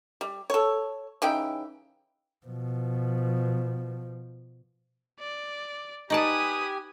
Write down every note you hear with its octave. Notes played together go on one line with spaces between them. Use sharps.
G3
A4 C#5
C#3 E3 D#4 G5
B2 F3
D5
D#4 G4 B4 D5 G#5 A5 D#6